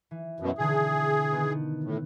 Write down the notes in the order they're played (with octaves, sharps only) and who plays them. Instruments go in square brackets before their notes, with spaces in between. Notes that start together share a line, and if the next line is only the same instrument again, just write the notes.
[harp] E3
[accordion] F#2 B2
[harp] B2 D3 E3 [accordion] G#4
[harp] D#3 B3
[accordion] A2